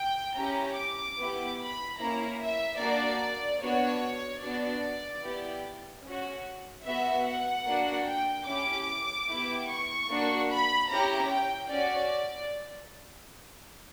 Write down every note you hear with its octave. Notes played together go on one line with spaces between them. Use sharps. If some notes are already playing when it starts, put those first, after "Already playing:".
Already playing: G5
C#4 E4 G4 A#5
D6
B3 E4 G4
B5
A#3 C#4 E4 A#5
E5
A#3 D4 F#4 D5
B3 D4 F#4 C#5
B3 D4 F#4 D5
B3 E4 G4
C#4 F#4
B3 F#4 E5
F#5
A#3 D4 F#4
G5
C#4 E4 G4 D6
B3 E4 G4
C#6
A#3 D4 F#4
B5
C#4 E4 G4 A#5
G5
C#4 F#4 D5